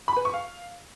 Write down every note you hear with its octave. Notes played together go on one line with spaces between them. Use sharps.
B5
B4
C#6
F5